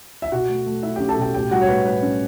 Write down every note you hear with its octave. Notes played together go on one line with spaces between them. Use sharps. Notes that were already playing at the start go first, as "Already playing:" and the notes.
E5
B2 F#4 F#5
A3
A3
A3 E4 E5
C#4 G4 G5
A4 A5
B2 G4 G5
A2 G4 G5
G3 F#4 F#5
C#5
A2 B4
A2 B4
C#4